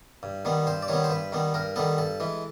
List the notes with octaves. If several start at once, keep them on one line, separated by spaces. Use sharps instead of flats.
G2
D#3 G3 B3
G2 C5
D5
D#3 G3 B3 C#5
C5
G2 B4
D#3 G3 B3
G2 A#4
D#3 G3 B3 A4
G2 A4
E3 G#3